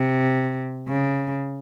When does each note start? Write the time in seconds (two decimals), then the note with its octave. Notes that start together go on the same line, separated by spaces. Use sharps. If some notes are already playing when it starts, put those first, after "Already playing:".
Already playing: C3
0.88 C#3